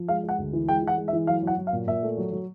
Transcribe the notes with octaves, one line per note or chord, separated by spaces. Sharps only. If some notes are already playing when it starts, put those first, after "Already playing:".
Already playing: F3
G#3 F5
G#3
F#5
D2
E3
G#3 G5
E3 F#5
G#3
E5
E3
F#3 F5
F#3 F#5
F#3
F5
A#2
A#2 E5
A3
F#3
F#3